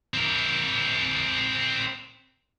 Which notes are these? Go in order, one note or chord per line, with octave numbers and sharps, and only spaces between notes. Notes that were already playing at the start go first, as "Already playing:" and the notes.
C4 A#4